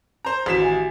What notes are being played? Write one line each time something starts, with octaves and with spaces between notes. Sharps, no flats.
C5 A#5 G6
A1 D#3 F#4 C6 B6 E7
G4 E5 G#5